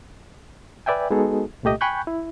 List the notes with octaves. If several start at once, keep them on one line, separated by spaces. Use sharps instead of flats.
B4 D5 E5 G5 G#5
G#3 B3 D#4 F#4 G#4 A4
C2 A#2 A3 G4 D#5
G5 G#5 B5 C#6 F#6 G6
E4